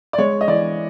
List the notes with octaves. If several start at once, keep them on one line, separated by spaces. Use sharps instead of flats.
D5
G#3 C#5
D#5
E3 D5